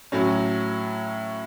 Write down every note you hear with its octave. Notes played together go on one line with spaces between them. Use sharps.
A2 F#3 C#4